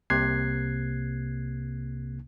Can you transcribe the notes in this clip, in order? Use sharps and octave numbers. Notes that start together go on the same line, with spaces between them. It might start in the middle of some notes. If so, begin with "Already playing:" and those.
C2 C3 A#3 F#6 G#6 C7